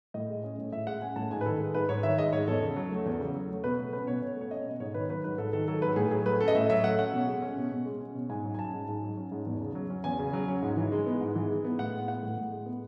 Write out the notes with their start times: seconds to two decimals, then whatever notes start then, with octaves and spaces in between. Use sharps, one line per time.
0.14 A2 D#5
0.29 G#3
0.44 C#4
0.58 A2
0.72 A2 E5
0.87 G#3 F#5
1.02 C#4 G#5
1.16 A2 A5
1.31 G#2 G#5
1.41 B4
1.46 D#3 A4
1.60 G#3
1.75 G#2 B4
1.89 G#2 C#5
2.03 D#3 E5
2.18 G#3 D#5
2.33 G#2 C#5
2.47 E2 A4
2.62 C#3
2.76 F#3
2.91 A3
3.06 E2
3.20 C#3
3.35 F#3
3.49 A3
3.64 B2 B4
3.78 A3
3.93 C#4 B4
4.07 B2 C#5
4.22 B2
4.37 A3 C#5
4.51 C#4 D#5
4.66 B2
4.80 G#2 C#5
4.94 D#3 B4
5.09 F#3 B4
5.24 G#2 B4
5.38 G#2 A4
5.53 D#3 A4
5.68 F#3 A4
5.82 G#2 B4
5.96 A2 G#4
6.11 F#3 G#4
6.26 A3 B4
6.40 C#4 A4
6.48 D#5
6.55 A2 E5
6.70 F#3 E5
6.84 A3 F#5
6.99 C#4 F#5
7.13 B2
7.27 G#3
7.42 C#4
7.57 B2
7.71 B2
7.86 G#3
8.01 C#4
8.15 B2
8.29 G#2 G#5
8.44 F#3
8.55 G#5
8.59 C#4 A5
8.73 G#2
8.88 G#2
9.02 F#3
9.17 C#4
9.32 G#2
9.46 E2
9.61 C#3
9.75 F#3
9.90 C#4
10.04 E2 G#5
10.19 C#3
10.33 F#3
10.48 C#4
10.62 G#2
10.77 E3
10.92 G#3
11.06 B3
11.21 G#2
11.35 E3
11.50 G#3
11.65 B3
11.79 A2 F#5
11.93 G#3
12.08 B3 F#5
12.23 A2
12.37 A2
12.52 G#3
12.66 B3